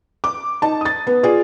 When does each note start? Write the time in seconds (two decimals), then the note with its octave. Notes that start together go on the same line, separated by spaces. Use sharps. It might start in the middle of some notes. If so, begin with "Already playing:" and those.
0.24 D6
0.62 D#4 A5
0.81 D#6 A6
1.07 B3
1.23 F4 G#4 D5